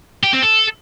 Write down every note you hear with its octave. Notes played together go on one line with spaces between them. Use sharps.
G4
C4
A4